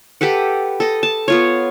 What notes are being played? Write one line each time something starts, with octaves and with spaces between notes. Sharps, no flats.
G4 A4 B4 F#5
A4 D#5
A5
B3 F4 C#5